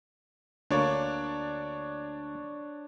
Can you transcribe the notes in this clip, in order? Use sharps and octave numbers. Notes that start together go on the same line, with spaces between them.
D2 A#3 D4 C#5 D5